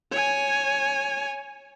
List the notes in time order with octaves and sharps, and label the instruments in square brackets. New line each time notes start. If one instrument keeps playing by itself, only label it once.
[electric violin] C#5 G#5